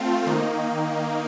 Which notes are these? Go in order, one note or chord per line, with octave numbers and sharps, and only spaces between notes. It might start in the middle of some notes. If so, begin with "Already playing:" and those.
Already playing: A3 C4 F4
D#3 A#3 D#4